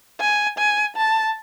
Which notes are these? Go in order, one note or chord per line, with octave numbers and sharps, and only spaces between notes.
G#5
G#5
A5